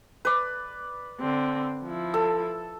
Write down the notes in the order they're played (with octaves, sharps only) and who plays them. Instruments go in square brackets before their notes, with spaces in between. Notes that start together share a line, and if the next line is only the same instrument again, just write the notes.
[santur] B4 D5
[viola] D3 C4
F3 E4
[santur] A4